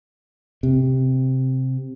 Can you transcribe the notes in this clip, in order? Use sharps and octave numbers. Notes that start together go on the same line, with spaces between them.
C3